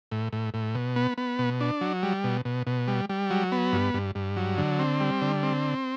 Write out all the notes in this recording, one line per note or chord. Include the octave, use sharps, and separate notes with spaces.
A2
A2
A2
B2
B3
B3
B2
D4
F#3
G3
B2
B2
B2
G3
G3
F#3
B3
G2
G2
G2
F#3
D3
C4
G3
D3
C4